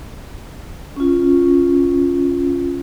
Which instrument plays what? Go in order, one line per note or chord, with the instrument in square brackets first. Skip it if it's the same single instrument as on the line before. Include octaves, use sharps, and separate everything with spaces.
[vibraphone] C#4 F4